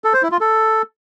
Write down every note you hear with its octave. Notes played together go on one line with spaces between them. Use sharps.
A4
C5
E4
F4
A4